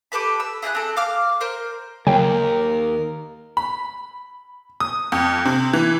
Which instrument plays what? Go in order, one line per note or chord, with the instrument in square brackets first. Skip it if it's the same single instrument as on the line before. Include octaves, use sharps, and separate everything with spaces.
[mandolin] G4 A4 B4 B5
E6
E4 G#4 A#5 F#6
C4 A4
F5 D6 F6
A#4 C5
[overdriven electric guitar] D#2 [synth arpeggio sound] C#3 F#3 G5 [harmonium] A#4
[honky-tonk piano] B5
D#6
F2
C3
E3